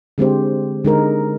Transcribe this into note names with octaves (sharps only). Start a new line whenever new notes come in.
D3 G#3 C4 G4 C5
D3 G#3 D#4 A#4